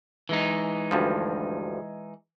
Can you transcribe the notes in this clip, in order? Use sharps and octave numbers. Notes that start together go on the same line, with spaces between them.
E3 G#3 D#4
D2 G2 F3